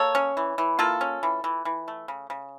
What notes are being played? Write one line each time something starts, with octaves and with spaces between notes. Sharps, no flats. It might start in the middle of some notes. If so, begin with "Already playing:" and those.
Already playing: A#3 A4 C#5
C#4
E3
E3
A#3 F4 A4
C#4
E3
E3
E3
A3
C#3
C#3